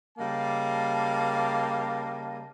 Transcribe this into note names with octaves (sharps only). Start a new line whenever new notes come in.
C#3 G3 A#3 D#5 F5 A5